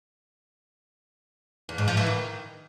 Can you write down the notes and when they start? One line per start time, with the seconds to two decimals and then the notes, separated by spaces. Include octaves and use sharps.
1.69 E2
1.78 G#2
1.88 F3
1.97 E3
2.06 D#3